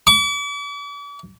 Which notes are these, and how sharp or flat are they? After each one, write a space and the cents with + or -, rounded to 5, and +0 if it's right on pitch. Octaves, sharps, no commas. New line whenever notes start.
D6 -45